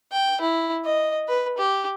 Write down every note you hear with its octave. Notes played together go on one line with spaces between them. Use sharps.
G5
E4
D#5
B4
G4